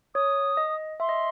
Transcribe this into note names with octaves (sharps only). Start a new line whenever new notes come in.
C#5 D#6
D#5
E5 C6
D#5